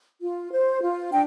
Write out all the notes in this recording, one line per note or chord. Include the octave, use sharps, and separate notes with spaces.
F4
C5
F4
D4 G5